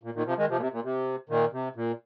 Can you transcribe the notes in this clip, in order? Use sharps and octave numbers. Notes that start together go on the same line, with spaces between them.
A#2
A#2 D#3
C3 F3
D#3 G#3
C3 F3
A#2
C3
A#2
C3
A#2 D#3
C3
A#2